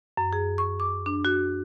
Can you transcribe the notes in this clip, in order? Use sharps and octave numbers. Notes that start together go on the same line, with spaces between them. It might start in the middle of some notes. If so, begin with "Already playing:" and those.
F#2
G#4
C#6
D6
D4
F#4